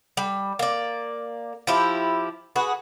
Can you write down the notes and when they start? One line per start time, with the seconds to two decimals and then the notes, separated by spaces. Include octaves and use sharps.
0.17 G3
0.59 A#3 D5
1.67 F3 E4 G4
2.56 F#4 G#4 B4